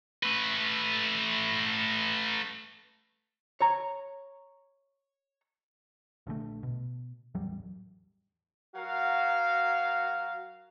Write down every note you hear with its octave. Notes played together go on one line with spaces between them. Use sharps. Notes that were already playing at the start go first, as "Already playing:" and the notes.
A3 B4
C#5 A#5
A#1 D3 D#3 A3
B2
A1 E2 F#3 G3
F#3 F#4 A#4 F5